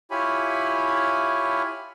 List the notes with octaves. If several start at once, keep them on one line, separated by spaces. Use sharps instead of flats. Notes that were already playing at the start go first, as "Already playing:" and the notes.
E4 F4 G4 C#5 G#5 B5